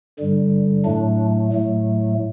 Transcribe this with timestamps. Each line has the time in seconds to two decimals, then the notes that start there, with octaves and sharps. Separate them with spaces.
0.19 G2 D3 G3
0.85 A2 F#3 A3 D4
1.52 A2 F#3 A3